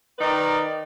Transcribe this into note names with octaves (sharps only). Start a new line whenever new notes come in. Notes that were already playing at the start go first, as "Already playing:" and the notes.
D#3 D#4 B4 D5